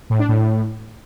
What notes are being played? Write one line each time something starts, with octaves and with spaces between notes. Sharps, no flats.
A2
D4
A2